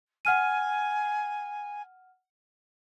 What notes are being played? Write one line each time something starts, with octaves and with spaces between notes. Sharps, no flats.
F#5 G#5 F6 D#7